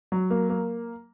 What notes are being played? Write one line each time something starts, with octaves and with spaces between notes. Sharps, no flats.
F#3
A#3
A#3